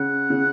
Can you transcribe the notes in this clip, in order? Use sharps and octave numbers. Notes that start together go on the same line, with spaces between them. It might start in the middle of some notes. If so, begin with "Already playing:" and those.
Already playing: C#3 F#5
C#3